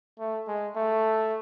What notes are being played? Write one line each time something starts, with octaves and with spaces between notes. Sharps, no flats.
A3
G#3
A3